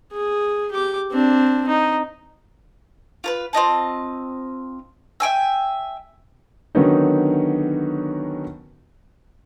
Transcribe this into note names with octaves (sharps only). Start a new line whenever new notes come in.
G#4
G4 D6
C4 D4
D#4
F4 A#4 B4
C4 F4 D#5 A5
E5 G5 G#5 E6
D3 D#3 F#3 B3 C#4 D#4